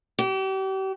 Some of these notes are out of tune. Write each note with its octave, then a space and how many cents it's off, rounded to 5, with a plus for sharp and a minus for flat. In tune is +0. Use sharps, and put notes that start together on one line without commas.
G4 -40